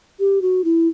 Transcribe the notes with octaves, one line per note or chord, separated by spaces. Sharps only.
G4
F#4
E4